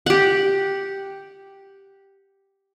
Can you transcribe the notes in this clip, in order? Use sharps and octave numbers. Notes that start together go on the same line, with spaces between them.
G4 F#5